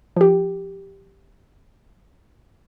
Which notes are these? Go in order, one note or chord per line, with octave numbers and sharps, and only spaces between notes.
F3 G4